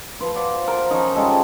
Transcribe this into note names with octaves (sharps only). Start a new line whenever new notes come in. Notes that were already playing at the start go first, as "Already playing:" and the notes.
F3 B4 C6
C5 D5 F5 F#5
A#4 C5
F3 C#4 D#4
C#3 G3 G#3 A4